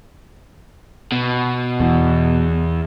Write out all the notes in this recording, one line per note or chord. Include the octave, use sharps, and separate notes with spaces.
B2
E2